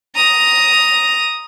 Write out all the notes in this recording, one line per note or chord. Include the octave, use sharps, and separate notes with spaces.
A#5 D#6